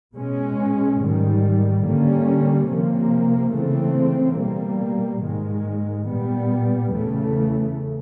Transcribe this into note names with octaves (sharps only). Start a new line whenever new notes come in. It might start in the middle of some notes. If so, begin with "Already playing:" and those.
B2 G#3 C#4
G#2 D#3 G3
D3 G3 A#3 C#4
C3 F3 A#3
C#3 E3 A3 C4
B2 G3 A#3
G#2 D#3 G#3
A#2 G3 B3
E2 C#3 E3 A3